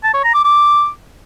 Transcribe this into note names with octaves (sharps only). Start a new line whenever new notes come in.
A5
C#5
A#5
D6
D6